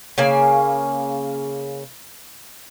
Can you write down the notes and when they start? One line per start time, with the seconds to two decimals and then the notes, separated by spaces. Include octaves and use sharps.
0.18 C#3 A#3 G#5